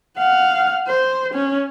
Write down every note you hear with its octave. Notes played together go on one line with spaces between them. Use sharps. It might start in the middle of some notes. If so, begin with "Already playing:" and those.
F5 F#5
C5
C#4